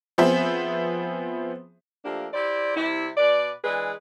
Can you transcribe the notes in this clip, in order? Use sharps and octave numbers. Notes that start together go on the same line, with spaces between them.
F3 B3 C4 G#4 C5 E5
F3 A3 A#3 D4 G4
E4 G4 C5 D5
C3 G3 E4
B2 B4 D5
E3 G#3 D4 G#4 B4